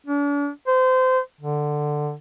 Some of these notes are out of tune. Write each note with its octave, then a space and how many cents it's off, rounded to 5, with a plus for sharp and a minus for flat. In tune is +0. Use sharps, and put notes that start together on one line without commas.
D4 -40
C5 -25
D3 +15